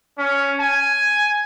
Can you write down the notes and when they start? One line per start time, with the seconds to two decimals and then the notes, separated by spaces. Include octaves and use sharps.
0.19 C#4
0.60 G#5